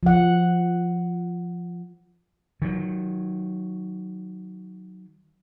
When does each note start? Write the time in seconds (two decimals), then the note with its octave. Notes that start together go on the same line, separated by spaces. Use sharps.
0.03 F3 F#5
2.62 D#3 F#3